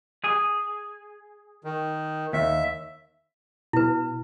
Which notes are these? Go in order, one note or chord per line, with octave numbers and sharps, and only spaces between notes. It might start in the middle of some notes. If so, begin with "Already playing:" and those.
G#4
D#3
D#2 E5
B2 E4 B4